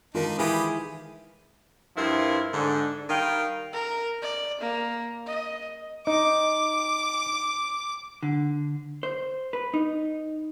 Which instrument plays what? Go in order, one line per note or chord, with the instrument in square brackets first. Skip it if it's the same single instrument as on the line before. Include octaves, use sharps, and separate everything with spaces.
[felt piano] D#3 F4 [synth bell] G#3 A#4 [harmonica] D4 D#4
[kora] E3 G#4 F5 [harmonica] G4 B5 D#6
[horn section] G2 F3 C4 E4 A#4
G#2 D3
D#3 G3 F5 G5
[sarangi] A#4
D5
A#3
D#5
[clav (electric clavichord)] D#4 [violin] D6
[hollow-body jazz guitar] D3
C5
B4
D#4